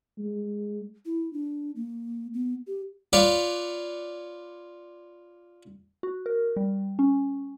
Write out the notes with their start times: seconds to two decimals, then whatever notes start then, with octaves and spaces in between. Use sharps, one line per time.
0.19 G#3
1.06 E4
1.33 D4
1.76 A#3
2.34 B3
2.67 G4
3.13 F4 B4 C#5 D5 F5
6.03 F#4
6.26 A#4
6.56 G3
6.99 C#4